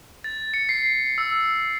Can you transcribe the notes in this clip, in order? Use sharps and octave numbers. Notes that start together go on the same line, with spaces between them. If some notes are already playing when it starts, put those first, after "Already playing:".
A6
C#7
C7
E6